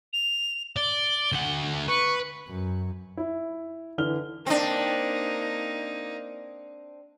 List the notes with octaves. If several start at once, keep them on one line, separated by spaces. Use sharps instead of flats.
F7
D5 G7
D2 F#5
B4 C#6
F#2
E4
D3 E3 F6 G7
A#3 C4 D4 D#4